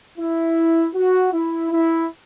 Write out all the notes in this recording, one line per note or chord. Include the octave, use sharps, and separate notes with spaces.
E4
F#4
E4
E4